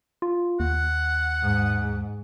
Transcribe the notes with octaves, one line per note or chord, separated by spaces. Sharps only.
F4
D#2 F#5
G#2